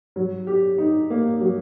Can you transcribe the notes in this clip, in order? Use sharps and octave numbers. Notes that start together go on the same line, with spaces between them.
F#3
G4
D#4
A#3
F#3